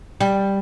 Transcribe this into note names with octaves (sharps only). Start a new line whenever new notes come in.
G3